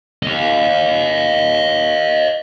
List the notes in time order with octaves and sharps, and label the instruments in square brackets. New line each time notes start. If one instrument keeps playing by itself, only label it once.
[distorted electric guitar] D#5 F5